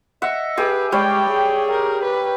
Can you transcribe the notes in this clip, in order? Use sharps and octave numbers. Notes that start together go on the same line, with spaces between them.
D#5 E5 F#5
G4 G#4 B4
G3 G#3 C#5 G5
G#4
A#4
B4